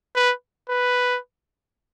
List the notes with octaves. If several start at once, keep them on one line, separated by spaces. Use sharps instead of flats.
B4
B4